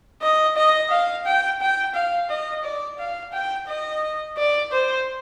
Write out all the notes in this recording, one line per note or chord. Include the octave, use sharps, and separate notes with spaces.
D#5
D#5
F5
G5
G5
F5
D#5
D5
F5
G5
D#5
D5
C5